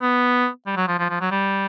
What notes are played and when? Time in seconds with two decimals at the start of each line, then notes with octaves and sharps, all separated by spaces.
0.02 B3
0.67 G3
0.77 F#3
0.88 F3
0.99 F3
1.10 F3
1.21 F#3
1.31 G3